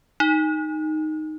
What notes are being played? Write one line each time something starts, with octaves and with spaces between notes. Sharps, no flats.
D#4